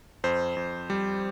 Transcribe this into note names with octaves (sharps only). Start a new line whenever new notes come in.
F2 C5
F2
G3